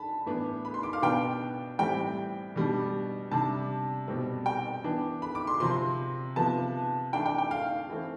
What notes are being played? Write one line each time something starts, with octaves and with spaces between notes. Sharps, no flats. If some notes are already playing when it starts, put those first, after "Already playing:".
Already playing: D3 A5 B5
A2 E3 B3 D4
B5
C6
D6
F5
B2 B3 D4 G5
A2 E3 G3 C4 G5
B2 G3 D4
C3 G3 D4 A5
B2 G3 C4
G5
E3 B3 D4
B5
D6
C6
C3 F3 C4 C6
C3 F3 B3 A5
E3 A3 D4 G5
G5
G5
F5
E3 A3 C4